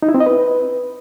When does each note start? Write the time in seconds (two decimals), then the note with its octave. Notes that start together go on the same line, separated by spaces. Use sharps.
0.03 D#4
0.08 E4
0.14 C4
0.20 D#5
0.26 B4